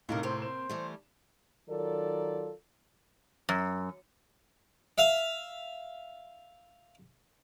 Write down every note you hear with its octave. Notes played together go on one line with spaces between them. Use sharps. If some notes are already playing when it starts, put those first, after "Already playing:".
A2 C3 D#4 G4 A#4 F5
A#3 C4 C5
C5 E7
E3 G3 A3
D#3 F#3 F4 A4 A#4 D5
F#2
E5 F5